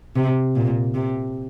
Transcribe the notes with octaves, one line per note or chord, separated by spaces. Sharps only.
C3
A#2
C3